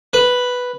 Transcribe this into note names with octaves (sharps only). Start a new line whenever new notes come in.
B4